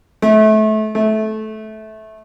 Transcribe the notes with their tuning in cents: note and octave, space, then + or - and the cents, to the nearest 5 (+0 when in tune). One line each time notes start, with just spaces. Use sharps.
A3 -25
A3 -15